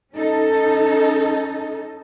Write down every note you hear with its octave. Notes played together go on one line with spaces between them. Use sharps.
C#4 D#4 A4